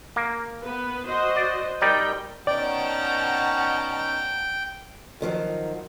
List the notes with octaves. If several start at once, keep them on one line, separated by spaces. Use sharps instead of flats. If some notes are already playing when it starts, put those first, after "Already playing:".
A#3
B3 B4
F#4 C5 D#5
D5
G3 D#4 A#4 D5 G5
B2 C#4 D#4 D5 F#5 G5 A5 A#5
F2 D#3 F3 F#3